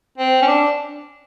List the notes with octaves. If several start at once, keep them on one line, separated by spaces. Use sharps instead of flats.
C4
C#4
D4